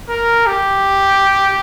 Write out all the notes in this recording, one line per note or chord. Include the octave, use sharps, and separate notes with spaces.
A#4
G4